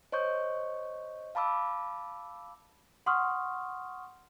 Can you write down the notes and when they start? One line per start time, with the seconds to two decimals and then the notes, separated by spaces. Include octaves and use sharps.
0.12 C5 C#5 D#5 C#6 G6
1.35 F5 A5 B5 D6 E6
3.06 F#5 C6 C#6 D#6 F6